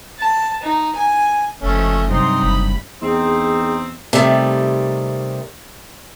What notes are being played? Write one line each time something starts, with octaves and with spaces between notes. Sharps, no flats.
A5
D#4
G#5
F#1 F3 A3 C#4 D#5
G2 C3 F#3 D#4 C6
F#1 B5
E2 C4 D#4 G#4
C3 D#3 G3 A3